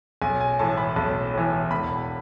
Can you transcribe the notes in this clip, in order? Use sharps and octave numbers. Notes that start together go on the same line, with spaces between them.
B1 G#5
G#5
A2 E3 A5
B5
B1 A5
A2 E3
E1 B5